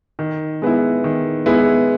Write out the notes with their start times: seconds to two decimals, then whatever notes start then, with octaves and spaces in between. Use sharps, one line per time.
0.19 D#3
0.62 G#3 B3 E4
1.04 D#3
1.46 G#3 B3 E4